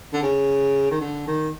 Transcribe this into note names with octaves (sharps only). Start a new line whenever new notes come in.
D3
C#3
D#3
D3
D#3